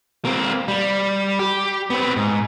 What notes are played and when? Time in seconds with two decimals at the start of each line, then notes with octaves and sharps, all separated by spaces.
0.25 A#3 C4
0.68 G3
1.39 G4
1.90 B3 C4
2.16 G#2